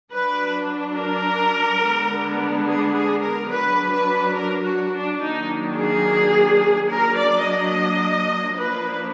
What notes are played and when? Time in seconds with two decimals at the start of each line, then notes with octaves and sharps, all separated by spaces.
0.12 F#3 D4 B4
0.97 A#4
1.82 D3 G#3 B3 D4
2.67 G#4
2.94 G#4
3.23 A#4
3.51 F#3 D4 B4
3.93 B4
4.36 A#4
4.64 F#4
4.92 D4
5.20 D#3 F#3 A#3 D4 D#4
5.77 G#4
6.90 F#3 A#3 D4 A#4
7.18 D5
7.45 D#5
8.58 F3 A#3 D4 B4